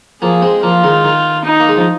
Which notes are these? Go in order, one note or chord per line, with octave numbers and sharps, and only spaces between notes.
F3 A#3 G#4
G#3 C4
F3 A#3 F4
D#3 G#3
D#3
D#4
A#3
G#3
F3